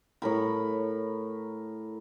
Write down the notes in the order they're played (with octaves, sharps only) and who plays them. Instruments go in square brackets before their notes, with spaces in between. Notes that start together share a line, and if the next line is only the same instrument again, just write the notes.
[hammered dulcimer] A2 A#4 B5